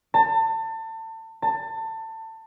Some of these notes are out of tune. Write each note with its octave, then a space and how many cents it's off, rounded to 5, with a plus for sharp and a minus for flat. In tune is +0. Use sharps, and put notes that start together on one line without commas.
A5 +30
A5 +25